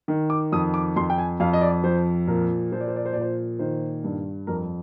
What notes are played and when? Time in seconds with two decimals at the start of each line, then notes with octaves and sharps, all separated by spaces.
0.08 D#3
0.30 D6
0.52 F2 D#6
0.74 D6
0.96 F2 C6
1.10 G5
1.18 G#5
1.40 F2 F5
1.53 D#5
1.61 D5
1.83 F3 C5
2.27 A#2 A#4
2.72 F3 C5
2.81 D5
2.88 C5
2.96 D5
3.05 C5
3.13 A#2 D5
3.21 C5
3.59 D#3 C5
4.04 G2
4.47 F2 A#4